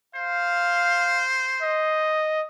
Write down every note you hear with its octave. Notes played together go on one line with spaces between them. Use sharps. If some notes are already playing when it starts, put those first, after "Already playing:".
C5 F5
D#5